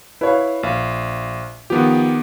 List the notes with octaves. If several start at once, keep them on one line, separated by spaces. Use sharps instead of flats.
E4 B4 C#5 F5
A#1 F5
D#3 F3 B3 G4